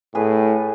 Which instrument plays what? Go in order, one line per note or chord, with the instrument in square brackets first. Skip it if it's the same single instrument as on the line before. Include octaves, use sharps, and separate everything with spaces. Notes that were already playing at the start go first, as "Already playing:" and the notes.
[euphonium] A2 [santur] G#4 B4